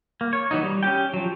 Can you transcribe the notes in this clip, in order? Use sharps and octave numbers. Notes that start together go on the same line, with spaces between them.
A#3
C#5
E3 F#3 D#4
G3
C#4 G4 G5
F3 F#3